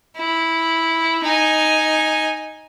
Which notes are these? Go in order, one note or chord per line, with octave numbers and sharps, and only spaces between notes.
E4
D#4 G#5